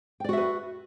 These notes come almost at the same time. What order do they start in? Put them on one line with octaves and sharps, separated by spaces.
G5 D5 F#4 E5 B4